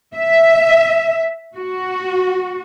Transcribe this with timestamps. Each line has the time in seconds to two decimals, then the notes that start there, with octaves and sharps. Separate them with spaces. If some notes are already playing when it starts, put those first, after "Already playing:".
0.15 E5
1.55 F#4